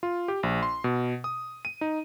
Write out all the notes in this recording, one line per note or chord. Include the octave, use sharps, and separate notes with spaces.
F4
G4
A#1
C6
B2
D#6
D#7
D#4